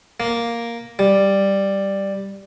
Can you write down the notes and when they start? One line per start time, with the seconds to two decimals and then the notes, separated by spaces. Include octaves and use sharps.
0.20 A#3
0.99 G3